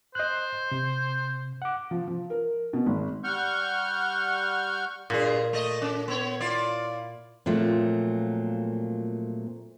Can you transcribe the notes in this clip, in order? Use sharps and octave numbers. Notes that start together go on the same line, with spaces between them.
C5 D#5 F#6
C3
F#5 D6
F3
F3
A#4
B2
G#1
G3 F#5 C#6 F6 G6
G2 A#2 G#4
A3 D#5
C#4
B3 C#5
E4 F4 D5
A#2 F3 F#3 A3 C4